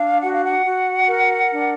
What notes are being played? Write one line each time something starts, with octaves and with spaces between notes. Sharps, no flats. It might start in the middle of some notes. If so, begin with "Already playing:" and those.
Already playing: D4 F5
F#4 F#5
F5
F#5
F#4
A#4
D4